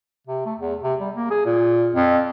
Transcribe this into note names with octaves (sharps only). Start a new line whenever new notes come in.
C3
A3
E2
C3
G3
A#3
G#4
A#2
F2